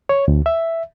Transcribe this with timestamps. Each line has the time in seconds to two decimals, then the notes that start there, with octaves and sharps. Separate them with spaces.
0.09 C#5
0.28 D2
0.46 E5